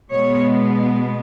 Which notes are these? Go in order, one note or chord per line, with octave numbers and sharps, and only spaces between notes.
B2 G#3 B3 C#5